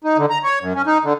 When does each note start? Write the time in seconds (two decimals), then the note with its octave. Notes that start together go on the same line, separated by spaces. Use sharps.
0.04 D#4
0.18 D3
0.30 A#5
0.44 C#5
0.61 F#2
0.75 C#4
0.87 D#4
1.04 D3